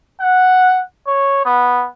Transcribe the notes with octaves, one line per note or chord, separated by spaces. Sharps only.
F#5
C#5
B3